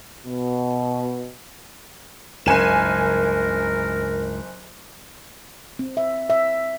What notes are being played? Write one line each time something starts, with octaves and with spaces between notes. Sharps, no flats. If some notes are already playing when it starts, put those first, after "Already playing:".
B2
F#1 C#2 G2 A#4 G#5 E7
C4
E5
E5